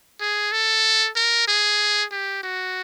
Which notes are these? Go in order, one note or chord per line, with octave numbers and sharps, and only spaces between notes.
G#4
A4
A#4
G#4
G4
F#4